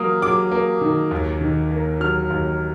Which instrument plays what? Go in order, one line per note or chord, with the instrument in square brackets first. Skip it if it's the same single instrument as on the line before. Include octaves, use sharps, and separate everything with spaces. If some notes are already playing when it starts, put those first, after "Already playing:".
Already playing: [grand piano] F#3 A#3 [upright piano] D#6 F6
[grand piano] F#3 [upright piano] D6
[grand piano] A#3
D#3
D#2
D#3
A#3
[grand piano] F#3 [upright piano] F6
[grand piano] D#2